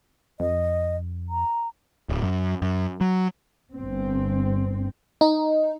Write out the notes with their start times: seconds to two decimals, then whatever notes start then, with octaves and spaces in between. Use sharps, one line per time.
0.40 F2 D#5
1.29 A#5
2.09 D1
2.23 F#2
2.62 F#2
3.01 F#3
3.75 G1 C4
5.21 D#4